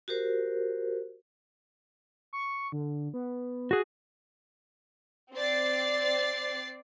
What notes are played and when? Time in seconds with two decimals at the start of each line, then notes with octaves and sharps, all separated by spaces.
0.08 F#4 G4 A#4 C5
2.33 C#6
2.72 D3
3.14 B3
3.71 F#4 G#4 F#5
5.34 C4 D5 A6 C7